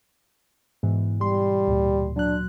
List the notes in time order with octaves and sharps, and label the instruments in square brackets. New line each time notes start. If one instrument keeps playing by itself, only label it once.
[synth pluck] G#2 B2 E3
[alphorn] G3 [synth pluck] C6
[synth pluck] D2 A#2
[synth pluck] F#3 F#6 [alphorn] D4